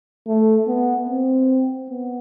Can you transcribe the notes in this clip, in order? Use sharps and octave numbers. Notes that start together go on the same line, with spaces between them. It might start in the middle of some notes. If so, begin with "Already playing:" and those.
A3
B3
C4
B3